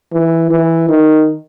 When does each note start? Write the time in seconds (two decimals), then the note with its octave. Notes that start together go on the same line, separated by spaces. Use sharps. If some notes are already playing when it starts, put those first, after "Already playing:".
0.12 E3
0.51 E3
0.89 D#3